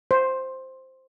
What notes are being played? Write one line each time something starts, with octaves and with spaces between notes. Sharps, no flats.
C5